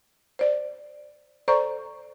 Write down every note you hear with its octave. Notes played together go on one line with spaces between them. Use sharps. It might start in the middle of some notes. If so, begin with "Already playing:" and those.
C5 D5
A4 C5 D5 A#5 C#6 G6